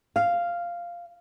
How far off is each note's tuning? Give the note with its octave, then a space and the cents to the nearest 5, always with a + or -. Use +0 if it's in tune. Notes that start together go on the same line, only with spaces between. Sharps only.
F5 -5